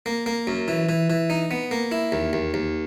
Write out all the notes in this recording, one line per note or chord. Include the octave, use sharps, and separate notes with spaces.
A#3
A#3
F#2
E3
E3
E3
D#4
B3
A#3
E4
D#2
D#2
D#2